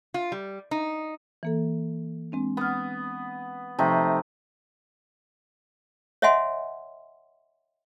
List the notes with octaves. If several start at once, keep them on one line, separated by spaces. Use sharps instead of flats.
F4
G3
D#4
E3 A#3 A4
G#3 C4 D4
B3 F#5 F6
C3 F3 A3 D#4
C#5 D#5 E5 F#5 G#5 C6